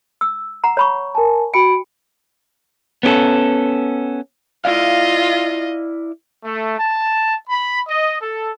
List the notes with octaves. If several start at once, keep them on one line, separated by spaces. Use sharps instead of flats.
E6
F#5 A#5
C#5 B5 C#6
A#4 G#5 A5
F#4 G5 B5 D7
B3 C#4 G4 A4
E4 F4 D5 D#5 F5
A3
A5
B5
D#5
A4